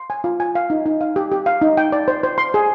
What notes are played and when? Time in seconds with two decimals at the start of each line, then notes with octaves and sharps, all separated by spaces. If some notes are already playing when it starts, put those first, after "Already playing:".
Already playing: C6
0.10 G#5
0.24 F4
0.40 G#5
0.55 F5
0.70 D#4
0.86 D#4
1.01 F5
1.16 G4
1.32 G4
1.46 F5
1.62 D#4
1.77 G5
1.92 D5
2.08 C5
2.23 C5
2.38 C6
2.54 G#4